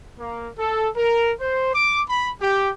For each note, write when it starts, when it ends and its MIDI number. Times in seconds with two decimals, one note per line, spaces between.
0.19 0.49 58
0.58 0.88 69
0.96 1.32 70
1.41 1.72 72
1.74 2.01 86
2.08 2.31 83
2.40 2.70 67